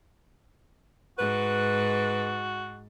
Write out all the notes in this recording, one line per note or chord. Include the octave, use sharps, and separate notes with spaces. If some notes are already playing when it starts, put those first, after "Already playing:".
G#2 F#4 B4